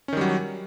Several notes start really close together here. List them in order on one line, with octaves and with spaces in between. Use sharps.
C#4 D#3 G3 F#3